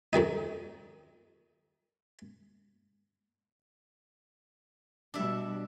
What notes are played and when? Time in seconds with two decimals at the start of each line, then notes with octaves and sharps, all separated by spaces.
0.13 F2 D#3 G3 D#4
5.14 B2 G3 D4 E5